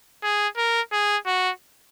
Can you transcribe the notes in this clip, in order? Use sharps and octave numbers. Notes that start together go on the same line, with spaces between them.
G#4
A#4
G#4
F#4